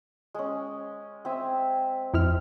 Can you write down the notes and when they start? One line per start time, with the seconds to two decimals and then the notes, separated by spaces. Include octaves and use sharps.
0.34 G#3 C#4
1.25 C4 E5 G#5
2.14 F2 E4 F6